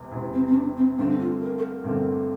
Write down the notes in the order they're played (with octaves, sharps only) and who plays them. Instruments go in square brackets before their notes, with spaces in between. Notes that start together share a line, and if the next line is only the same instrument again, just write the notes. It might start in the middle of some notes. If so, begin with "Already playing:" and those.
Already playing: [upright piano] E1 E2 C3
E1 E2 C3
[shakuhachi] C4
C4
D4
C4
[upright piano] G1 G2 D3 A3 C4 [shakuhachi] D4
[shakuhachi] F4
A#4
A4
A#4
[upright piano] G1 G2 D3 A3 C4